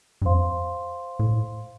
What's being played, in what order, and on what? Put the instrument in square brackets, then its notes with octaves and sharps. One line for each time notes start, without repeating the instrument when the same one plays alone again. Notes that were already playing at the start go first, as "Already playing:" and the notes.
[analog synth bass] G2
[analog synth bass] F2 [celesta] C5 F5 C6
[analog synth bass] A2